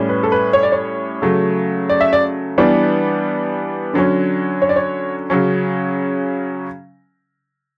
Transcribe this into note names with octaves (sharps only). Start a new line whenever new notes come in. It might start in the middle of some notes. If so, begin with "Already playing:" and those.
Already playing: A2 G3 C#4
B4
A4
B4
C#5
D5
C#5
C#3 F#3 A3
D5
E5
D5
E3 G3 B3 D4
D3 F#3 C#4
C#5
D5
C#5
C#3 F#3 C#4